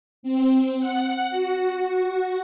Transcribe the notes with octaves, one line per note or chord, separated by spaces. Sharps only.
C4
F#5
F#4